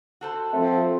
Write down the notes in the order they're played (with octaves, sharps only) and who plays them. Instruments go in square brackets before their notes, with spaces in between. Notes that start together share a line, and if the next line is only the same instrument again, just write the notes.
[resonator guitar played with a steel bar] F#4 A4 C5
[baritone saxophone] F3 [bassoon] A3 [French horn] C4